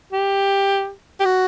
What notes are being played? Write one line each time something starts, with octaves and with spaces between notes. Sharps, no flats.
G4
G4
F#4